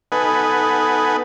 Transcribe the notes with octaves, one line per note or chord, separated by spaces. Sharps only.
B3 D#4 A4 B4 F#5 G#5